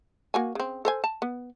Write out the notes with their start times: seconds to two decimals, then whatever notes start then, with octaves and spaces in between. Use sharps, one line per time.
0.34 A#3 F#4 G#5
0.55 C#3 C4
0.85 A4 C5 G#5
1.04 A5
1.22 B3